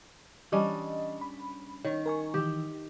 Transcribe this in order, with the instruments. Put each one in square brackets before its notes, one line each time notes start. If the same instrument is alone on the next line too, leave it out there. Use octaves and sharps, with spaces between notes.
[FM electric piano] E3 D#5 [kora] G3 C#4 D4
[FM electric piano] B5
[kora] D#3 [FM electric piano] C#5
[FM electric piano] A#4 G#5 C#6
[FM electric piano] D#3 E3 [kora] G4